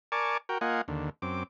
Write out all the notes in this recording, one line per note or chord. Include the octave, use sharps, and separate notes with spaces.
A#4 D5 G#5 A5 C#6 D6
F#4 A#4 G5
A#3 F4 D#5 F#5 G#5
D#2 D3
F#2 C4 D6